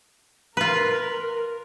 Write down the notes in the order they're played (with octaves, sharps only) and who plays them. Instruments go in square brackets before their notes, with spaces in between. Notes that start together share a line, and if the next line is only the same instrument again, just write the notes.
[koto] F4 B4 [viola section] A#4